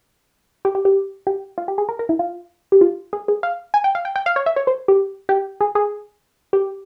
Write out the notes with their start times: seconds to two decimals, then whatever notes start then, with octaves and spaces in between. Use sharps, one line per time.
0.65 G4
0.75 G4
0.85 G4
1.27 G4
1.58 F4
1.68 G4
1.78 G#4
1.89 A#4
1.99 A#4
2.09 E4
2.19 F4
2.72 G4
2.81 F4
3.13 G#4
3.28 G#4
3.43 F5
3.74 G#5
3.84 G5
3.95 F5
4.05 G5
4.16 G5
4.26 F5
4.36 C#5
4.46 E5
4.56 C#5
4.67 C5
4.88 G4
5.29 G4
5.61 G#4
5.75 G#4
6.53 G4